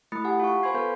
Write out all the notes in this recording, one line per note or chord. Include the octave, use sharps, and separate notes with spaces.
A3 E4 B5 D#6 A6 C#7
G4 F#5 G#5
F4 F5 C#6
C5 G#5 B5 C6 G#6 C7
B3 A4 B4 F5 C6 G6